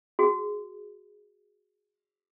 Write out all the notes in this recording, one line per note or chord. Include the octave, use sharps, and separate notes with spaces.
F#4 G#4